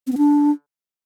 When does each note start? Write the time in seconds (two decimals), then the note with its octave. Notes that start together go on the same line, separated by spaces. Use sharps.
0.07 C4
0.12 B3
0.17 D4